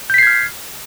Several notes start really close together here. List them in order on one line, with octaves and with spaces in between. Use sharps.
G6 B6 C7 G#6 F6